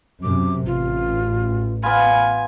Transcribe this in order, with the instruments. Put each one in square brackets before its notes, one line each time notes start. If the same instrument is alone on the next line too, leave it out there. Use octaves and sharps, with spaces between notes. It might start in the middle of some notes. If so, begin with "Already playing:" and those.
[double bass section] F#2 C3 [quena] D6
[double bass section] A1 [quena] F4
[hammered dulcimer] B3 F4 [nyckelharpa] G#5 [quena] B5